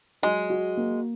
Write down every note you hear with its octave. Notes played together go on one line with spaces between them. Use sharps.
F#3 G#3
F#4
A#3